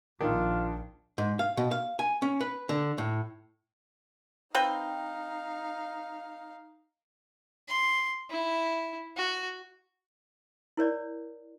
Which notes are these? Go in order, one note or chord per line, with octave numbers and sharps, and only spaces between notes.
A#1 D#3 D4 F4
G#2
F5
B2
F5
G#5
C#4
B4
D3
A2
C4 D#4 B4 F5 G5
C6
E4
F#4
E4 A#4 C#5 D5